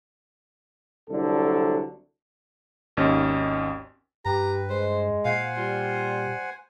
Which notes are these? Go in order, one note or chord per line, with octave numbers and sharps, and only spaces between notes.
C2 D3 F#3 A4
G#1 D#2 C#4 D#5
G2 G4 B4 A#5
G#3 C5
A#2 C5 F5 F#5 G#5
G3 F4